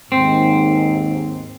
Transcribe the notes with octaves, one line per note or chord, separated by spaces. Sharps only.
D#2 G#2 C4